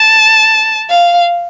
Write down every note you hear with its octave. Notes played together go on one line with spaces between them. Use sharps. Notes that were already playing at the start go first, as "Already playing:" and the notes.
Already playing: A5
F5